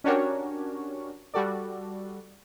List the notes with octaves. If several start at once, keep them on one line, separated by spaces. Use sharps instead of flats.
C#4 D4 F#4 G4 A#4 C#5
G3 F#4 A4 D5